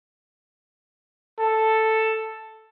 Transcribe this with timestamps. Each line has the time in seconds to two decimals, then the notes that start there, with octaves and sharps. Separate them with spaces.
1.39 A4